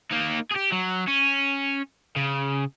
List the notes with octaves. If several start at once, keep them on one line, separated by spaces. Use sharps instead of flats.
A#3 D#4
G4 G#4
F#3
C#4
C#3